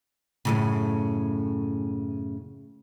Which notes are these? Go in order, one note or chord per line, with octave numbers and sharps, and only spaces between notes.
F#2 A2 C#3